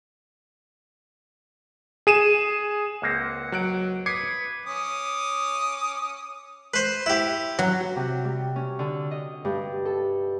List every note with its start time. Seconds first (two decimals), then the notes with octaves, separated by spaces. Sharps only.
2.07 G#4 D#7 E7
3.02 C#2 A#3 C4 F#5
3.52 F#3 F#6 D7
4.06 B4 D6 D#6 G#6 C7 C#7
4.66 C#4 D6 D#6
6.74 B4 C5
7.06 E4 G4
7.59 F#3
7.80 F#4
7.96 C3
8.24 G3
8.56 C#4
8.79 D3
9.11 D#5
9.45 G2
9.85 A4